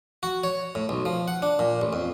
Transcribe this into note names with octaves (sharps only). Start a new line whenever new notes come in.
F#4
C#5
A2
B1
F3
F#5
D4
A#2
A1
F2